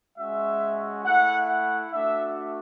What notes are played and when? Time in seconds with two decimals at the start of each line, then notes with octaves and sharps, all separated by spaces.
0.17 G#3 C#4 F#4 E5
1.05 A3 E4 F#5
1.48 F#5
1.92 A3 D4 F#4 E5